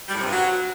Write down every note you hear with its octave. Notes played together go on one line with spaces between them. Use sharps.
G3
A2
C3
G2
F#3